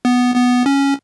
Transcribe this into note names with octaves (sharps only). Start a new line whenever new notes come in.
B3
B3
C#4